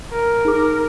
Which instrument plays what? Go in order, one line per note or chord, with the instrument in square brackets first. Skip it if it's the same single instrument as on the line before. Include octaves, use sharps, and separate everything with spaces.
[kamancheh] A#4
[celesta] D#4 G#4 D6